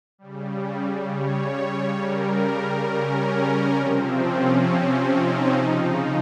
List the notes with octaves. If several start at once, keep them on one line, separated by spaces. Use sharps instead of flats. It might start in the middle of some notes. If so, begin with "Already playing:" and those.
C#3 G3
C#5
C#3 G3 A#4
C#4
C3 F3 C4
C#4
D#4
C#3 F3